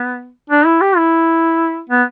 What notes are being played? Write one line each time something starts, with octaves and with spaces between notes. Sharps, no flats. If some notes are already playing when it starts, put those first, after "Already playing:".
Already playing: B3
D4
E4
G4
E4
B3